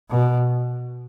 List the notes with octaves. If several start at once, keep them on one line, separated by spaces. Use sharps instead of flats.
B2